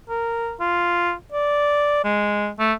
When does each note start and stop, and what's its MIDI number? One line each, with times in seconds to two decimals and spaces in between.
0.09 0.54 70
0.60 1.13 65
1.32 2.03 74
2.04 2.50 56
2.60 2.73 57